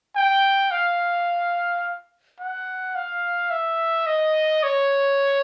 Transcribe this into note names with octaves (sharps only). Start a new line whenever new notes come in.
G5
F5
F#5
F5
E5
D#5
C#5